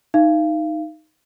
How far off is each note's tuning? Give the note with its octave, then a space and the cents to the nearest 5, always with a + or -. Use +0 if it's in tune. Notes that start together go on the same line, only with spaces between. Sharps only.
D#4 +0 F5 -30